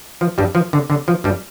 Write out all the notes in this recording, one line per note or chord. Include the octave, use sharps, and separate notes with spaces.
F3
G2 G3
F3
D3
D3
F3
G2 G3